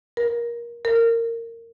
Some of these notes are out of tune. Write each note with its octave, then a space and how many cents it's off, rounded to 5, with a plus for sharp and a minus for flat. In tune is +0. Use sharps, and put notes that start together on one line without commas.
A#4 +20
A#4 -20